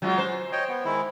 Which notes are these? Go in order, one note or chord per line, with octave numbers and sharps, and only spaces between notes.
F#3 G#3 F4
C5
C#5 D#5 G5
B3
D#3 G#3 E4